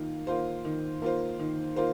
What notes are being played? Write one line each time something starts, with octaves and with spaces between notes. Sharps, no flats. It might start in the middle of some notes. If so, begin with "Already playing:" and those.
Already playing: D#3 A#3 F4
A#3 F4 C5
D#3
A#3 F4 C5
D#3
A#3 F4 C5